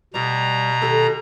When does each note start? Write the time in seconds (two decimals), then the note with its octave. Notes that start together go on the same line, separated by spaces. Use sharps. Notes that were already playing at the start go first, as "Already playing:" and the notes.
0.14 B2 G3 G4 A#5
0.82 D#3 G4 A4